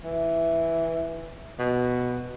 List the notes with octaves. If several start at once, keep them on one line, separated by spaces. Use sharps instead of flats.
E3
B2